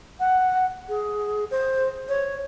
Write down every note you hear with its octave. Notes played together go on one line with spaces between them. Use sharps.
F#5
G#4
C5
C#5